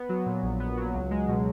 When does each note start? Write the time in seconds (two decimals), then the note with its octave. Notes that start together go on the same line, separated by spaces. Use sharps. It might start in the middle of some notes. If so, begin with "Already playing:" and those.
Already playing: B3
0.09 F#3
0.26 A#2
0.43 A#1
0.60 B3
0.77 F#3
0.94 C#2
1.11 G#3
1.28 B2